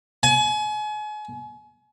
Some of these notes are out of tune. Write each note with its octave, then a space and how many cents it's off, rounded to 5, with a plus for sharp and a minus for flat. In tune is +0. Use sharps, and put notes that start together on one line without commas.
G#5 +35